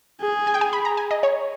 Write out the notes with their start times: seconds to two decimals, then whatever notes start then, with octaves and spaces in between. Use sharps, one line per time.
0.21 G#4
0.47 G#5
0.54 G5
0.61 G#5
0.73 B5
0.85 A#5
0.97 G#5
1.11 D#5
1.23 C#5